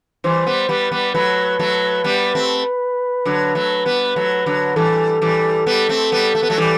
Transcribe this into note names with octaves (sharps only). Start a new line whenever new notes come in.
E3 G3 C5
G3 B3
G3 B3 B4
G3 B3
F#3 A3 B4
F#3 A3
G3 B3
A3 C4
D3 F#3
F#3 A3
G3 B3
F#3 A3
D3 F#3
E3 G3 A4
E3 G3
G3 B3
A3 C4
G3 B3
A3
B3
F#3 A3
E3 G3